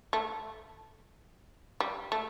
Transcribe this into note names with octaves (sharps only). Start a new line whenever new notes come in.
A3
G3
A3